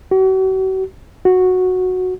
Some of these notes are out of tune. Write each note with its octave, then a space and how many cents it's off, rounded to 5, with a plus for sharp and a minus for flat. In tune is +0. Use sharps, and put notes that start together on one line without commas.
F#4 +40
F#4 -10